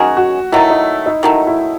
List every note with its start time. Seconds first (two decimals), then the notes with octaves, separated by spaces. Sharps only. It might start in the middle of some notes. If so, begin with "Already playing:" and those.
Already playing: D#3 F#3 C#4 F#4 G#4
0.17 F#4
0.52 D#3 F#3 A3 E4
0.70 D#4
1.06 D#4
1.23 D#3 F#3 A3 E4
1.47 E4